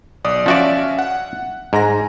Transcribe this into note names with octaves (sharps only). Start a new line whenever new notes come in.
B1 D5 D#6
F3 C#4 F#4 D5 E5 F5
F#5
G#2 G#5 A#5 A#6